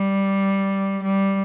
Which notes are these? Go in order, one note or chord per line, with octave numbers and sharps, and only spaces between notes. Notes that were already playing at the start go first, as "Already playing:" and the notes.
Already playing: G3
G3